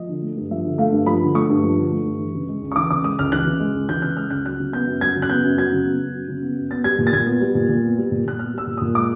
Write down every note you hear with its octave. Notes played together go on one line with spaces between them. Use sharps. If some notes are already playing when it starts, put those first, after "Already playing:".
Already playing: F3 D#5
D3
A3
G2
F3 E5
D3
A3 F5
G2
F3 B5
D3
A3 C#6
G2
F3
D3
A3
G2
E3
C#3
G#3
C#2
C#6
E3 D6
C#3 D6
G#3 D#6
C#2 F6
E3 F#6
C#3
G#3
C#2
E3 G6
C#3 F#6
G#3 F6
C#2 F#6
F#3 F#6
C#3
B3 G6
F#2
F#3 G#6
C#3
F#6
B3 G6
F#2
F#3 G#6
C#3
B3
F#2
F#3
C#3
B3
F#2
B3 A6
G3 G#6
A#2
A6
A#2 G#6
B3
G3
A#2
A#2
B3
G3
A#2
A#2 F#6
B3 F6
G3 E6
A#2
A#2 D#6
G#3 D6